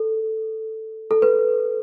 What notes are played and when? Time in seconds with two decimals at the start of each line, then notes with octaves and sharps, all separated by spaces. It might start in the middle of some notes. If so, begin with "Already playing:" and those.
Already playing: A4
1.11 A4
1.22 B4